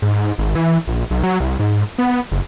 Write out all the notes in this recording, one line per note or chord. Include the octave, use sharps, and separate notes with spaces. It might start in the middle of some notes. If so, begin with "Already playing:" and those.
G#2
G#1
E3
A#1
B1
F#3
C2
G#2
B3
F#1